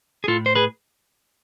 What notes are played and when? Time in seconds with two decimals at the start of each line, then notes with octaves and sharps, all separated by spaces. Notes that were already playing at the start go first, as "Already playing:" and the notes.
0.24 G#4
0.28 A2 F4 A4
0.46 C5
0.55 G#4 B4